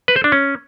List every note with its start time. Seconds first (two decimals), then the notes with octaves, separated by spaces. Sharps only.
0.08 B4
0.16 C5
0.24 D4
0.32 C#4